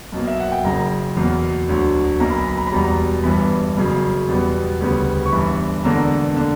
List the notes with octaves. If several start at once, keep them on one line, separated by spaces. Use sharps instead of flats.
B1 B2 A#3
E5
F#5
G5
F#1 F#2 C#3 A#5
E2 B2 F#3 A#3
D2 D3 F#3
B1 B2 A#3 A#5
B5
A#5
B5
A#5
B5
E1 E2 B2 G3 A#5
G1 G2 E3 B3 B5
F#1 F#2 C#3 F#3
E2 B2 G3 B3
D2 C#3 G3 B3
C#6
G1 G2 E3 B5
E1 E2 D3 A#3 A#5
D3 A#3